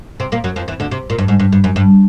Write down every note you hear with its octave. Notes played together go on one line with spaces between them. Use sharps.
C3 C4
A#2 A#3
F#2 F#3
F2 F3
E2 E3
D2 D3
C3
A#2
G2
G#2
G2
G2
F#2
G2